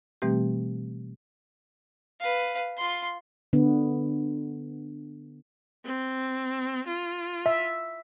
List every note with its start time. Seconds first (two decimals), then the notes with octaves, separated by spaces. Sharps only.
0.22 B2 E3 G3 A3 C4 G4
2.20 B4 F5
2.77 F4 C6
3.53 D3 B3
5.85 C4
6.87 F4
7.46 E5